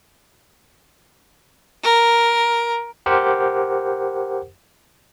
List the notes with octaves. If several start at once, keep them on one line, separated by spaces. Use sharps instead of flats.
A#4
G4 A#4 C5 F#5